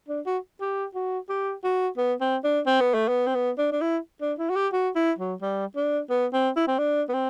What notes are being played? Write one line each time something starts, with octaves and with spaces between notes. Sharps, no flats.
D4
F#4
G4
F#4
G4
F#4
B3
C4
D4
C4
B3
A3
B3
C4
B3
D4
D4
E4
D4
E4
F#4
G4
F#4
E4
F#3
G3
D4
B3
C4
E4
C4
D4
B3
C4